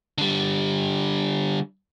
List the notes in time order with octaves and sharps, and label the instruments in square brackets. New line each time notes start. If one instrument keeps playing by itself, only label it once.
[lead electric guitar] D3 G3